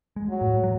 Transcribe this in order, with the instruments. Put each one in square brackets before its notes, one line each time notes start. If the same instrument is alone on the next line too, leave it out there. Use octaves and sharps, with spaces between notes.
[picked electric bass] G#3
[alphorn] F#3
[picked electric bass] A2
F#3